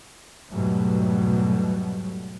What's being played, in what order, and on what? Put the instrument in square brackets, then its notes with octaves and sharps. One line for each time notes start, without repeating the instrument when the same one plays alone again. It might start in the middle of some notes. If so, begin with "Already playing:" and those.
[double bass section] E2 G#2 B2 F#3 G3 A3